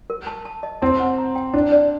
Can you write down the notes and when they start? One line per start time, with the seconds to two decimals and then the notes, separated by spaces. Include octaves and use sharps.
0.10 A#4
0.27 A5
0.45 A5
0.63 D#5
0.82 C4 A5
0.99 F#5
1.18 A#5
1.35 G5
1.54 D4 A5
1.72 D5